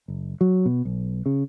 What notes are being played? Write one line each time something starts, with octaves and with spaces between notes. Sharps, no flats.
F#1
F#3
B2
B1
C#3